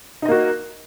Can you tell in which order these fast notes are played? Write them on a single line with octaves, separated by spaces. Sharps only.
D#4 D#5 A#3 F#4